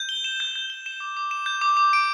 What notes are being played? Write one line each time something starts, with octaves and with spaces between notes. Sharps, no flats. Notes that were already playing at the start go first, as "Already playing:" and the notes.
Already playing: G6
G7
E7
G6
G6
G7
E7
D6
D6
E7
G6
D6
D6
D7